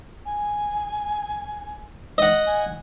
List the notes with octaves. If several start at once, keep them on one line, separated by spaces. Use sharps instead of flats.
G#5
D#5 F#5
G#5